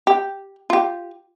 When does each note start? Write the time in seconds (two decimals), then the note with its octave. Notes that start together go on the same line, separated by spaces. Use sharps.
0.07 G4
0.70 F4 G4